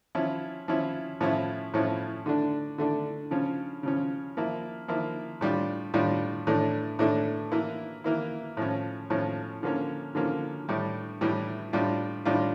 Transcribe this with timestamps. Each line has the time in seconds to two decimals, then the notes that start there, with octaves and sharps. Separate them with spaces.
0.15 F3 C#4 E4
0.68 F3 C#4 E4
1.21 A2 F3 C#4 E4
1.74 A2 F3 C#4 E4
2.26 D3 A3 D4
2.78 D3 A3 D4
3.31 C#3 F3 C#4
3.83 C#3 F3 C#4
4.37 F3 A#3 E4
4.88 F3 A#3 E4
5.41 A2 G3 D4 F4
5.94 A2 G3 D4 F4
6.47 A2 E3 A3 D4
6.99 A2 E3 A3 D4
7.52 E3 A#3 E4
8.04 E3 A#3 E4
8.57 A2 F3 C#4
9.10 A2 F3 C#4
9.63 D3 F3 A#3 C#4
10.15 D3 F3 A#3 C#4
10.68 A2 E3 G3
11.21 A2 E3 G3
11.73 A2 G3 D4 F4
12.25 A2 G3 D4 F4